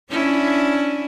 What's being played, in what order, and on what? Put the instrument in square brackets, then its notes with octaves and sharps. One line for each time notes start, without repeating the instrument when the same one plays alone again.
[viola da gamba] C#4 D4 E4